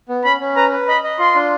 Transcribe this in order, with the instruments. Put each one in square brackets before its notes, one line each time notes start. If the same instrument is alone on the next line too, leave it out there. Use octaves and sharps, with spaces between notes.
[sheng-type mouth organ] B3
[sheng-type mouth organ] C#4 [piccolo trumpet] B5
[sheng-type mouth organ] C#4
[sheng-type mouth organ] B4 [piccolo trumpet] A#5
[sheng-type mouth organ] B4
[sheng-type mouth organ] D#5 [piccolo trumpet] B5
[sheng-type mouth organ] D#5
[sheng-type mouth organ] F4 [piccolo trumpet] C6
[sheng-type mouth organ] D4